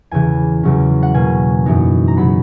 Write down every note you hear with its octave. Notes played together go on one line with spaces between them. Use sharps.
E2 C#3 E3 G#5
E2 C#3 F#3 C#4
F#5
B2 A#3 C#4 G#5
F#2 E3 B3 D#4
A#5
C#3 F#3 B3 B5